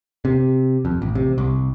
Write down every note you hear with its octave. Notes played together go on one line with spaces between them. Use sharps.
C3
F2
A1
C3
C2